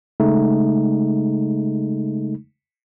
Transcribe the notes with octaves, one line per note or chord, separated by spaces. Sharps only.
C#3 G#3 A3 D#4